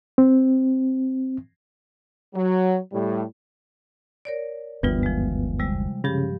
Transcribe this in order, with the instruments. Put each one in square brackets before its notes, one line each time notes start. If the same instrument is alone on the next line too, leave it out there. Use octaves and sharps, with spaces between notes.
[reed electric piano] C4
[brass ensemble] F#3
A2 G3
[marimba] A#4 C#5 D5
[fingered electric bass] F#1 D2 [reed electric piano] G2 B3 [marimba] E3 G3 F4
[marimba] F3 G#3
C3 G3 G#3
[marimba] G2 F3 G4 [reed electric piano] C#3